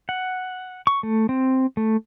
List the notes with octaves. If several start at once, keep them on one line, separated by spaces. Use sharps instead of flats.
F#5
C#6
A3
C4
A3